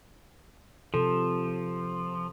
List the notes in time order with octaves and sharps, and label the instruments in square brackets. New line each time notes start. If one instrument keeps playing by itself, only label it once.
[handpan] C3 A4 [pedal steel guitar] F3